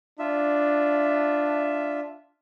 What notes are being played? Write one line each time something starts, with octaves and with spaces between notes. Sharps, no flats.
D4 F4 E5